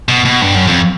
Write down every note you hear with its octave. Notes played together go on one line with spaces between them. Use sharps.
B2
B2
G2
F#2
F2